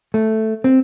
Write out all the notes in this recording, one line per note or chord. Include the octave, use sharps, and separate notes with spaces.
A3
C4